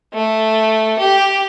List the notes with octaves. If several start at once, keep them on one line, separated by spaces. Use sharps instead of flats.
A3
G4